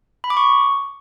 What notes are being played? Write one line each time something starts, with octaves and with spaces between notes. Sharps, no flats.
B5
D6
C#6